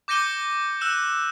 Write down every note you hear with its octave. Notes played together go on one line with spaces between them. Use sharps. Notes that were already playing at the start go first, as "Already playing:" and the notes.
D6 G6 A#6 C#7 D#7 G7
E6 F#6 E7